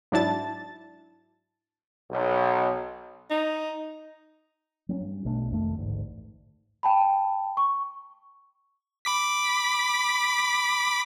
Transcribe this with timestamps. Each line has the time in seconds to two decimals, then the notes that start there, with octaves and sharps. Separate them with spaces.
0.12 G#2 F#3 D4 E4 A5 A6
2.10 B1
3.31 D#4
4.89 F#3 C4 C#4
5.01 G2
5.25 B1 B2 A3 D4
5.51 F1 F2 D#3 A3
5.77 A1 D2 G#2
6.83 G5 A5 B5
7.57 C#6
9.05 B5 D6 B6